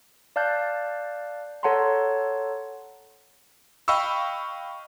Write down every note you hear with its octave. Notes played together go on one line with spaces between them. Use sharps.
D5 F5 A5 F#6 G6
A4 C#5 F#5 A5 A#5 C6
D#5 F5 G5 B5 C#6 E6